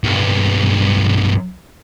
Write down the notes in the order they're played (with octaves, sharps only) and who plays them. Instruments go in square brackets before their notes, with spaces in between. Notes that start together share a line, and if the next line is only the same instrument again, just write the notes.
[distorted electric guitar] B1 G2